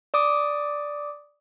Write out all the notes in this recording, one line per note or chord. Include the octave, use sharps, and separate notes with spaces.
D5 D6 D#6